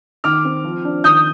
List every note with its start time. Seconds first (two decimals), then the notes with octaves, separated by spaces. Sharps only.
0.24 D#3 D6 F6
0.45 C4
0.64 F3
0.84 D4
1.04 D#3 D#6 G6